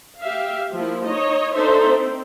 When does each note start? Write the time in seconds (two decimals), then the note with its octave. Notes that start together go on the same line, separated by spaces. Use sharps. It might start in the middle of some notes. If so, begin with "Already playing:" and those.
0.20 G4 E5 F5
0.74 F3 A#3 E4
1.06 D#4 C#5 D#5
1.55 D4 D#4 A4 C5 E5
1.88 C4